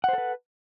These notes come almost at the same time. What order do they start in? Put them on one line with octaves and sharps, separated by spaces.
F#5 C5 A4 B4